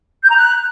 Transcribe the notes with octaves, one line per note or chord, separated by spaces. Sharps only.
G6
A#5
F#6